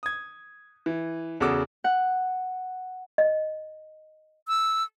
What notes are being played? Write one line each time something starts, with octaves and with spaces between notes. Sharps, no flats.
D#6 G#6
E3
E2 C#3 F#4 A4 D6 E6
F#5
D#5
E6